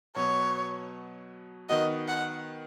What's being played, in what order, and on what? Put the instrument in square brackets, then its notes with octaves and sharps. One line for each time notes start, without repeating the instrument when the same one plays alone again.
[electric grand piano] B2 F#3 B3 [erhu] C#5
[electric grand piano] D#3 B3 F#4 [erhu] D#5
[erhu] F#5